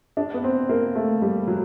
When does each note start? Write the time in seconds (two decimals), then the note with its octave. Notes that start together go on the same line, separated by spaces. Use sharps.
0.17 D4
0.34 B3
0.44 C4
0.69 A#3
0.95 A3
1.22 G3
1.48 F#3